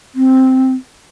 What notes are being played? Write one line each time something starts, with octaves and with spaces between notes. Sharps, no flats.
C4